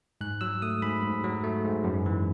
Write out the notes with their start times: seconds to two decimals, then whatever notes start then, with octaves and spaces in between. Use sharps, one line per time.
0.21 G#2 F#6
0.41 F#3 E6
0.62 A3 D#6
0.82 G#2 B5
1.02 G#2
1.24 F#3
1.44 A3
1.64 G#2
1.84 F#2
2.06 E3